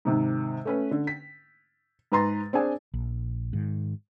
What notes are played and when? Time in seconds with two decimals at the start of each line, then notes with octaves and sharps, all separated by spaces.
0.05 G#2 C3 D#3
0.65 A3 C#4 B4
0.91 D3
1.07 B6
2.12 G#2 B4 A#5 C6 A6
2.53 C4 D4 G#4 G#5
2.94 A#1
3.53 G#2 D#3